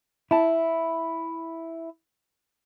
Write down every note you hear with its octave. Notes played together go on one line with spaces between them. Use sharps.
E4 A5